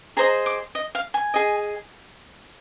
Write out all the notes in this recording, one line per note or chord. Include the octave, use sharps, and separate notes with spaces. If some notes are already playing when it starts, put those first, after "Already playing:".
G#4 C5 D#5 A#5
D6
D#5
F5
G#5
G#4 D#5